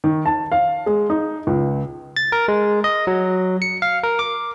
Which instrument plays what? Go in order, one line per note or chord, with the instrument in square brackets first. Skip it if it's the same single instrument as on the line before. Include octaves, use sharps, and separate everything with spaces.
[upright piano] D#3
A5
F5
G#3
D#4
C#2
[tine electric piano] A6
A#4
G#3
D#5
F#3
C#7
F5
A#4
D6